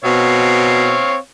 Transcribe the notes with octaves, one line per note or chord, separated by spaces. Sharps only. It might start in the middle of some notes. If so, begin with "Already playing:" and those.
B2 C4 C#5 F5